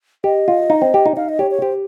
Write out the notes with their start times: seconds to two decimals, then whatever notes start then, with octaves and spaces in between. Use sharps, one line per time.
0.24 G4 D#5
0.48 F4
0.70 D#4
0.82 C4
0.94 G4
1.06 D#4
1.17 D#4 F5
1.29 D#5
1.39 G4 C#5
1.51 C#5
1.62 G4 C5